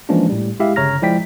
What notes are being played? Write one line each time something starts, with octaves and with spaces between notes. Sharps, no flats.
E3 F3 G#3 A#3 C#4 D4
A2 G3
G#3 E4 G4 E5 F5
G1 C#3 C#5 A#5 F6 A#6
F3 G#3 E4 D5 G5 B6